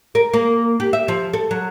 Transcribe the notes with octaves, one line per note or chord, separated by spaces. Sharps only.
A#4
A#3
G4
E5
F3
A4
F#3